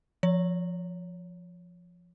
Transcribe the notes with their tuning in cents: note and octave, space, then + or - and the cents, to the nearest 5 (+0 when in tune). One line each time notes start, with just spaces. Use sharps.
F3 +0 C#5 +20